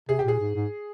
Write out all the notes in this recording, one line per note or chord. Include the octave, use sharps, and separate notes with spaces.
C3 G#4
G4
A#2 G#4
G#2
G#2